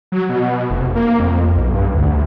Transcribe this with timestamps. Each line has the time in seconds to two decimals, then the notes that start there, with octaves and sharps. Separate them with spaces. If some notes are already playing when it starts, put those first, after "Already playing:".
0.12 F#3
0.29 B2
0.70 F1
0.95 A#3
1.20 F2
1.56 B1
1.74 G2
1.94 D2